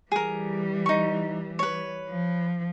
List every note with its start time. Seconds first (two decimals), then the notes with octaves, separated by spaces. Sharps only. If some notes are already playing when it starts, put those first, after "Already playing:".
0.12 E3 G3 G#4 A#4
0.86 D#4 C#6
1.59 B4 C#5
2.09 F3